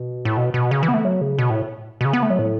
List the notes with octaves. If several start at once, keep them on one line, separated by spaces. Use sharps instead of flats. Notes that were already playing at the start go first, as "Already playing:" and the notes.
Already playing: B2
A2
B2
B2
C#3
E3
B3
A3
F#3
C#3
B2
A2
B2
C#3
B3
A3
F#3
A2